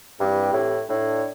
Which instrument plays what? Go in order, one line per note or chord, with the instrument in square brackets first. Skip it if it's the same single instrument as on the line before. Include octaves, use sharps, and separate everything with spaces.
[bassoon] G2 [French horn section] E3 C4 G4
[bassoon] A2
[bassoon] A2 [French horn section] D4